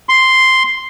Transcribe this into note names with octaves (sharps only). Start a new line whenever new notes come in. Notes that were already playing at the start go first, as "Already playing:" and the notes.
C6